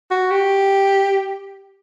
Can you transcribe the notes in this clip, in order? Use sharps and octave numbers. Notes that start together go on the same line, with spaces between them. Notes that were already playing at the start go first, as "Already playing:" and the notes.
F#4
G4